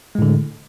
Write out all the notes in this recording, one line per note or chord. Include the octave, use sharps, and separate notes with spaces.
A2 D3 G#3